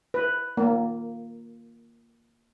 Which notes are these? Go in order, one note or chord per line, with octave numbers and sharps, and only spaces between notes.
B4
A#3